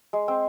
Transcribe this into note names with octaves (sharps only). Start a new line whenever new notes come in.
G#3
C4